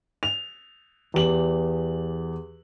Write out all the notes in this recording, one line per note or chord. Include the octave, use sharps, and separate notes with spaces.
F7
E2 G4 F#7